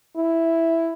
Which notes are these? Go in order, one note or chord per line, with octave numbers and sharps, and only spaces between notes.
E4